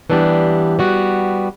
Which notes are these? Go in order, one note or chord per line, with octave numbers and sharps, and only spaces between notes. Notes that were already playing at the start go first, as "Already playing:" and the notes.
E3 G3 B3 D4 G4
G3 B3 F#4